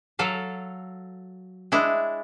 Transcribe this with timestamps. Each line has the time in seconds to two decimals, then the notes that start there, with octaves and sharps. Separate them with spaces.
0.19 F#3 A4 F5
1.72 G#3 D4 E4